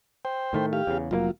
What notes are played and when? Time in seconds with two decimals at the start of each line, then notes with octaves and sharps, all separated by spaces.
0.25 C5 G5
0.53 A2 D#3 A3
0.73 G4 F5
0.87 E2 C#3
1.11 F1 A#2 F#3 A#3 F4